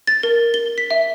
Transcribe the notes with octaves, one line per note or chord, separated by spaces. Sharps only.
A6
A#4
G7
B6
E5